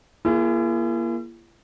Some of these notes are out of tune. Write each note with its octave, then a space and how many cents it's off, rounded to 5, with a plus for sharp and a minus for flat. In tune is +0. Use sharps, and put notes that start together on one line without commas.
A#3 +20 E4 +45 G#4 +0